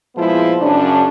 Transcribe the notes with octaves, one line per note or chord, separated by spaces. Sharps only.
A#2 F3 G#3 B3 E4
F#2 C#3 C#4 D4